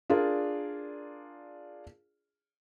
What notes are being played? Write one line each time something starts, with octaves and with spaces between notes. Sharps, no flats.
D4 F4 G#4 A#4 D5